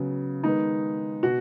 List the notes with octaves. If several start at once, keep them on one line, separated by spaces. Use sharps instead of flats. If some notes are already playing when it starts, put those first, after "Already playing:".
Already playing: C#3 F#3 B3
D#3 G#3 B3 D#4
B2 F#4